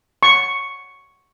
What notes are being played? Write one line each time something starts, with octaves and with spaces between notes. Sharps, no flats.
C#6